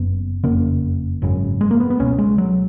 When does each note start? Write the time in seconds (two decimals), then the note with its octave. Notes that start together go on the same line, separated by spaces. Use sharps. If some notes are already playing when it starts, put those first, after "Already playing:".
Already playing: F#1 F#2 C#3 B3
0.43 F#1 F2 C#3 A#3
1.22 G#1 F#2 C#3
1.61 G#3
1.71 A#3
1.80 B3
1.90 B3
1.99 C#2 B2 C#4
2.18 G#3
2.38 F#3